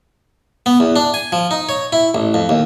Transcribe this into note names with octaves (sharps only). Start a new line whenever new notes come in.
B3
E2
D4
G#5
F3
D#4
C#5
E4
A1
F2
D#2